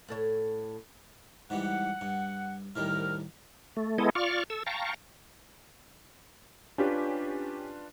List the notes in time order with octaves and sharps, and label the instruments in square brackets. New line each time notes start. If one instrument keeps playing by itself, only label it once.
[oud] A2 A4 C#5
[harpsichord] G#2 E3 G3 [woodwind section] F#5
[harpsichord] G2
[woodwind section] C2 A#4 F6 [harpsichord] A2 D#3 G3
[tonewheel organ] A3
G#3 B3 E4 A4 D#5
F4 D5 C#6 F6
A4 E6
F5 G5 A5 A#5 C#6
[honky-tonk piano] C#4 G4 [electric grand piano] D4 F4 B4